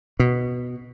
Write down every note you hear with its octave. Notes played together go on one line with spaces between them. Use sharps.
B2